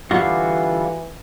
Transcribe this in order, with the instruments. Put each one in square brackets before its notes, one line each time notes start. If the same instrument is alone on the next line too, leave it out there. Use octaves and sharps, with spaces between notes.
[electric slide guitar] D3 G3 F4 [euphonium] E3 [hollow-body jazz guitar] F#4